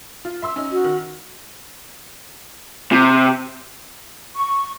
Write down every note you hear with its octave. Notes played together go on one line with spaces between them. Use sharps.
F4
E5 C6 E6
C#4 D#4
F#4
D#3
C3
C#6